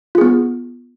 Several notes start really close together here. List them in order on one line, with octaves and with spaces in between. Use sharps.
F4 G#4 B3